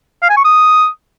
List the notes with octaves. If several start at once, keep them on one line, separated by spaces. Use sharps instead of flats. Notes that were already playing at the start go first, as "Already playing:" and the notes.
F5
G#5
C#6
D#6